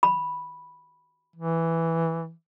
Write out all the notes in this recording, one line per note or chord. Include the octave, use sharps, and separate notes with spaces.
B5
E3